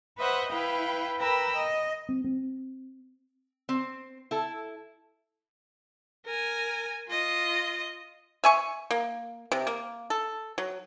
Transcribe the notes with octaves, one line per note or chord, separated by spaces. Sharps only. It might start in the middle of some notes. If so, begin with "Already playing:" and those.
B4 C5 D#5 E5 F#5
E4 B4 F5 G5
A#4 B4 G5 A#5 B5 E6
D#5
C4
C4
C4
E4 A4
A#4 G#5
F4 D#5
E5 G#5 C#6
A#3
C3
A#3
A4
F#3